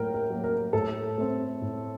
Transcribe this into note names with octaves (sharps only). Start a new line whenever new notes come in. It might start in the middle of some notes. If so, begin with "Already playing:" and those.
Already playing: A2 F#3 A#3 A#4 G5
A#4
F#3 A#3
A#4
A2 A4
A3 C4
A2